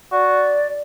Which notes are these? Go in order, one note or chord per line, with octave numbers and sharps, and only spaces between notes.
F#4 D5